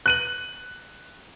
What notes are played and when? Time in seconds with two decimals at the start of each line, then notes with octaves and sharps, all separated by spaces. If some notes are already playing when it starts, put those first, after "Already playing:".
0.06 F#6 D#7 F#7